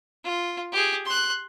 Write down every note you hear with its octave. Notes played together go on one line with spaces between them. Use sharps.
F4
G4 G#4
C6 F#6